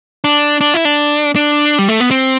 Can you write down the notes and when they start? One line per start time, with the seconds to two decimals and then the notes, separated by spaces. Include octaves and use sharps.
0.24 D4
0.61 D4
0.74 E4
0.85 D4
1.36 D4
1.79 G3
1.88 A3
2.00 B3
2.11 C4